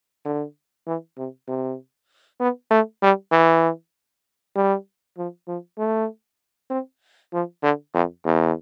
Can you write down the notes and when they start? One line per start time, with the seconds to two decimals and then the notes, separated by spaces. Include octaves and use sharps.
0.25 D3
0.86 E3
1.18 C3
1.48 C3
2.40 B3
2.71 A3
3.02 G3
3.32 E3
4.56 G3
5.17 F3
5.48 F3
5.78 A3
6.70 C4
7.33 F3
7.62 D3
7.94 F2
8.25 E2